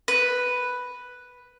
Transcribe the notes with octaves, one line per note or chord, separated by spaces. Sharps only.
B4